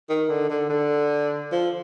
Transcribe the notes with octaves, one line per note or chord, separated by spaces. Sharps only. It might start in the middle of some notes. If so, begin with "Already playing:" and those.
D#3
D3
D3
D3
F3